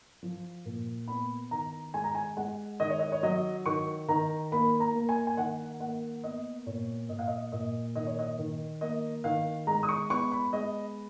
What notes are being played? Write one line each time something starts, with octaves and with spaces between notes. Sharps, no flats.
F3
A#2
B3 B5
D#3 A#5
G#3 G#5
A#5
G#5
G#3 F#5
D#3 D#5
C#5
D#5
C#5
F#3 D#5
D#3 C#6
D#3 A#5
A#3 B5
A#5
A#3
G#5
G#5
D#3 F#5
A#3 F#5
B3 D#5
A#2 C#5
A#2 D#5
F5
D#5
A#2 D#5
D#3 D#5
C#5
D#5
D#3
A#3 D#5
D#3 F5
G#3 A#5
D#6
C#6
B3 C#6
B5
G#3 D#5